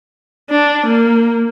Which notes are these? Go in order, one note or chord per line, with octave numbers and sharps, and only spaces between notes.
D4
A#3